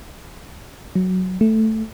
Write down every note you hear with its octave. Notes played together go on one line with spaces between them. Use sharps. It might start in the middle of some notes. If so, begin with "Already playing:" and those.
F#3
A3